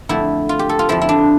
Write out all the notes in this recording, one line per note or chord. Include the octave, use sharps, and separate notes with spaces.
F2 D3 A3 E4
F4
G4
A4
F4
F2 D3 F3 E4
E4
D4